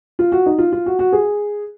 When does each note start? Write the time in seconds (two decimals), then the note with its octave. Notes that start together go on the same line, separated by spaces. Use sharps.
0.19 F4
0.32 F#4
0.46 D#4
0.58 F4
0.72 F4
0.86 F#4
0.99 F#4
1.13 G#4